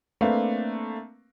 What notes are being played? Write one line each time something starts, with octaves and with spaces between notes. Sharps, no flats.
A3 A#3 C4 D4 B4 F5